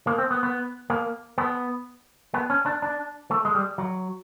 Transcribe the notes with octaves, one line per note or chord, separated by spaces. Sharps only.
A#3
C4
B3
B3
A#3
B3
B3
C#4
D4
D4
A3
G#3
G3
F#3